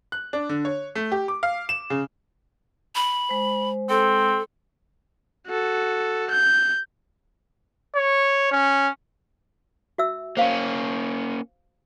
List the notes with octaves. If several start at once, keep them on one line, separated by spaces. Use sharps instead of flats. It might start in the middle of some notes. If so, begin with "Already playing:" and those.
F#6
D4
D3
C#5
A3
G4
D6
F5
E7
C#3
B5
G#3 C5
C4 A4
F#4 A4
G6
C#5
C#4
F#4 E5 E6
A#3 C#4 C5 F5